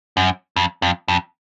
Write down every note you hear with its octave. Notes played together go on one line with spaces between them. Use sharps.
F#2
F2
F2
F2